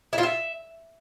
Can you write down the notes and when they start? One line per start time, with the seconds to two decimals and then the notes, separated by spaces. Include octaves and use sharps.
0.13 E4
0.18 F4
0.23 E5